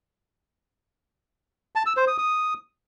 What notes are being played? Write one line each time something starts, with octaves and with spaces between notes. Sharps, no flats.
A5
E6
C5
D#6
D#6